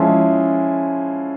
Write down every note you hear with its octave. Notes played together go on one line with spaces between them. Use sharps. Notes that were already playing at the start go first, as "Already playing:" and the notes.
Already playing: F3 G#3 C#4 E4